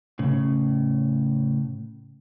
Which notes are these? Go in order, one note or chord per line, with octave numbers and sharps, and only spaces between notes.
A2 C#3